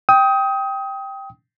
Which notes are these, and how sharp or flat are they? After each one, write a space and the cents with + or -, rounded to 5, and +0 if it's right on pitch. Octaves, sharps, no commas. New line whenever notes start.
G5 +0 D#6 +25